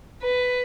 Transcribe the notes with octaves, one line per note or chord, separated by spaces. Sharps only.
B4